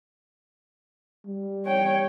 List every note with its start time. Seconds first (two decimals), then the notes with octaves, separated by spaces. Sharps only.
1.27 G3
1.66 C#5 G5